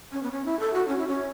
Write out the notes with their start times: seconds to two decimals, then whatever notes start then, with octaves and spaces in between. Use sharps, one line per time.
0.12 C#4
0.23 B3
0.31 C#4
0.45 E4
0.60 A4
0.74 F#4
0.88 C#4
0.98 E4
1.07 C#4